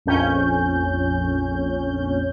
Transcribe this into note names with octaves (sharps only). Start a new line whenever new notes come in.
A#1 F2 C#4 G6